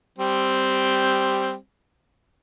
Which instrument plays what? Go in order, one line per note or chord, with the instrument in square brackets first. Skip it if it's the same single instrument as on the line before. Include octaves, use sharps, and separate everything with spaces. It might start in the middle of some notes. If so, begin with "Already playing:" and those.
[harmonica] G3 C4